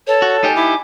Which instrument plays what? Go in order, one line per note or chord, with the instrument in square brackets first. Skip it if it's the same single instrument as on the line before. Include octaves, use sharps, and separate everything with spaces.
[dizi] A4 [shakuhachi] B4 [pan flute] C#5
[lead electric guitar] F#4 [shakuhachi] A5
[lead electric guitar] D#4 G4 [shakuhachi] G#5
[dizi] E4 [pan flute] D6